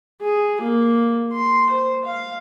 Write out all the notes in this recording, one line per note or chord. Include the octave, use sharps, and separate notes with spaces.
G#4
A#3
C6
C5
F5